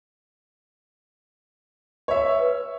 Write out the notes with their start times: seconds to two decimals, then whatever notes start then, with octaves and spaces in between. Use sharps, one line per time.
2.08 C#5 E5
2.39 B4